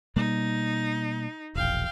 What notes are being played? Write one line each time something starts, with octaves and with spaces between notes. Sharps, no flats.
B2 G3 A#3 D#4
E1 A#1 F5 G5